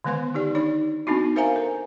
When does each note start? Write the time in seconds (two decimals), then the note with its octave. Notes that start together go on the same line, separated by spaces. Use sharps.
0.04 D3 D#3 G#3 B3 B4 C6
0.34 D#4 G4 D5
0.55 D4 D#4 C#5 D5
1.07 B3 C4 D4 D#4 F#4
1.36 A#4 C5 E5 F5 G#5 A#5
1.56 A4